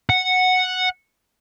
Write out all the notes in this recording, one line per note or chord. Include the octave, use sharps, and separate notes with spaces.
F#5